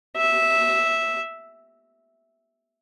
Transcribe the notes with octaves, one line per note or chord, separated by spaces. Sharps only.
E5